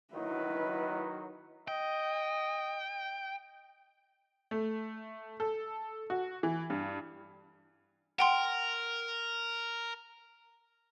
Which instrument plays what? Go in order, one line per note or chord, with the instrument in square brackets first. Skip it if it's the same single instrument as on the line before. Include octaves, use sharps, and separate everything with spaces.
[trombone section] D#3 F#3 [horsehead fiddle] E4 B4 [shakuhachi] D#5
[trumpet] D#5 [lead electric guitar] G5
[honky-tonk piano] A3
A4
F#4
E3
G2
[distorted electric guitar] A#4 [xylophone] F#5 G5 C6